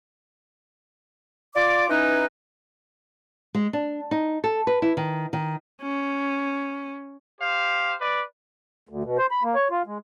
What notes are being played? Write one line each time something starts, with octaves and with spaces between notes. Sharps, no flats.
F4 D5 D6
E3 C#4 D#4 B4
G#3
D4
D#4
A4
B4
E4
D#3
D#3
C#4
G4 C5 F5
B4 D5
D2
B2
C5
B5
A#3
C#5
F4
G#3